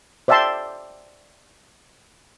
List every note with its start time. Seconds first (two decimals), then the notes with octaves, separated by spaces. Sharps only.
0.28 C5 D5 E5 G5 A5 C6